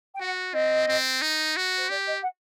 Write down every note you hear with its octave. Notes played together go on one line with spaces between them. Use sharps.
G5
F#4 F#5
C4 D#5
C4
D#4
F#4
C5
G4 D5
D#5
F#5